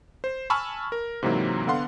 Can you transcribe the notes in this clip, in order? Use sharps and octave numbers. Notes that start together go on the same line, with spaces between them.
C5
G#5 A5 B5 C#6 E6 F6
A#4
G#2 C3 E3 F#3 A#3 C4
D3 B3 F5 F#5 C6